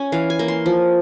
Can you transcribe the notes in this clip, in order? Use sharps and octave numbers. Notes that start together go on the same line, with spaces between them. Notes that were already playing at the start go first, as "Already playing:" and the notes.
Already playing: C#4 G#5
E3 F5
G#5
A#3
C6
F3